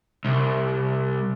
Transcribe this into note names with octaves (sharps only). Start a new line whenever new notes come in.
C2